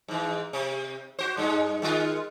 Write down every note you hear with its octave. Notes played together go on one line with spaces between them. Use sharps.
G#2 E3
C3
F#4 C5
G2 G#3
D#3 G#3 F4